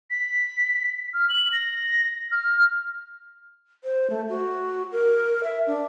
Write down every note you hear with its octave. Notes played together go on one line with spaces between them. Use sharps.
B6
F6
F#7
A#6
F6
C5
A3
F#4
A#4
E5
D4